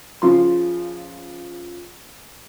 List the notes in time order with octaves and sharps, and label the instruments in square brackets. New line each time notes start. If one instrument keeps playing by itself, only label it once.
[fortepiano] C#3 F3 C6